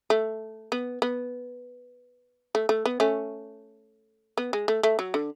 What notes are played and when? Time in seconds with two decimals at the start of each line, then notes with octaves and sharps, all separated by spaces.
0.10 A3
0.72 B3
1.02 B3
2.55 A3
2.69 A3
2.85 B3
3.00 A3 C#4
4.38 B3
4.53 G#3
4.68 A3
4.83 A3
4.99 F#3
5.14 D3